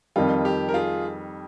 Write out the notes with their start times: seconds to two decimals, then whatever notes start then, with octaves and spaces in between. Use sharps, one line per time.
0.16 F2 D#3 G3 F4
0.45 G4
0.69 A#4
0.74 F4 G#4